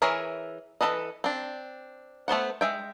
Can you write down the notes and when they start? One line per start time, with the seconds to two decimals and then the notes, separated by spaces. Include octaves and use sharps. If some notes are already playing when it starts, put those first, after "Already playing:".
0.02 E3 G#4 A#4 C#5 E5
0.81 E3 D#4 A4 B4 D#5
1.24 C4 D4
2.28 A3 B3 C5 F#5
2.61 G#3 E5 G5